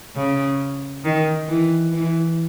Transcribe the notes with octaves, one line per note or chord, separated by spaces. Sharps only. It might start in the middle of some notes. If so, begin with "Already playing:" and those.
C#3
D#3
E3
E3